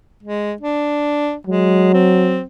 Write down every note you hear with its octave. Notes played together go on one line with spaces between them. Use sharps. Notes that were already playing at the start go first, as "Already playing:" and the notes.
G#3
D4
F#3 G#3
C4